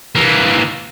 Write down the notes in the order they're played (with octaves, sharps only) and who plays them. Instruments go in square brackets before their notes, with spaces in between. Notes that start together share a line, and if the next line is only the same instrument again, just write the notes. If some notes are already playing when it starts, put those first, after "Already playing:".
[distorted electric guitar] E3 A#3